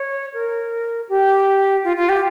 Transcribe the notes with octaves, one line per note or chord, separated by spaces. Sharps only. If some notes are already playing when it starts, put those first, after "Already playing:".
Already playing: C#5
A#4
G4
F4
F4
G4